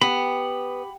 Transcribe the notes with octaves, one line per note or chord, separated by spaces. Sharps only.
B3 G4 B5